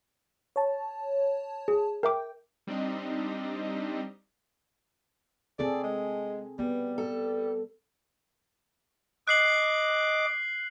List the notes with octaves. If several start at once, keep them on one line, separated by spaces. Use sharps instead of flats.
C#5 A5
G#4
A#4 E5 G5 D6
G3 C4 D4 D#4 G4 D#5
C4 G#4 A4 D5
G#3
G3 B3
A4
D#5 D6 F#6 C7 F#7